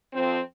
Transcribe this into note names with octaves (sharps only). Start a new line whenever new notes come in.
F2 F3 C4